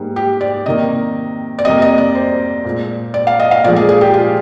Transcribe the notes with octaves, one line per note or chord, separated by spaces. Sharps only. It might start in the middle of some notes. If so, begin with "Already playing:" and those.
Already playing: G#2 G3 A#3
G4
D5
C3 D#3 A#3 D#5
D5
F2 C3 G3 A#3 D#5
D#5
D5
C5
A#2 G#3
D5
F5
D#5
F5
A#2 F3 G#3 D5
G#4
G#4
G4
F4